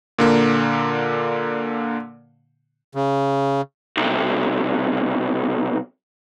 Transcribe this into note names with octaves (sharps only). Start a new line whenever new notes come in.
A#2 D3 A#3
C#3
B1 C3